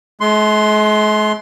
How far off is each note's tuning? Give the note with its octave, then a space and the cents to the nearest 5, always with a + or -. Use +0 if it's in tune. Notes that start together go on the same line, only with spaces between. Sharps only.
G#3 +45 C6 +0